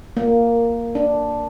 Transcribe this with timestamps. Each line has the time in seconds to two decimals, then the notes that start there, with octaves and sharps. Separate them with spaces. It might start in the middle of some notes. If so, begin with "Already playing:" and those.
0.17 A#3
0.95 D4